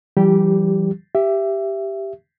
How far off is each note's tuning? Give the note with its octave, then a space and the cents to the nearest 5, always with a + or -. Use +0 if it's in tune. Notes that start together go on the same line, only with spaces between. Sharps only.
E3 +35 G3 -25 G4 +0
G4 +0 E5 +15